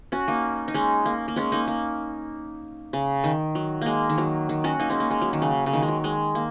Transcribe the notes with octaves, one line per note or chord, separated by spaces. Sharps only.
C#4 F#4
A#3 D#4
D#4
G#3 C#4
A#3
A#3
G#3 C#4
A#3 D#4
A#3
C#3
D#3
F#3
G#3 A#3
D#3
F#3
D#3
C#4 F#4
A#3 D#4
G#3 C#4
A#3
G#3
F#3
D#3
C#3
C#3
D#3
G#3
F#3
G#3
A#3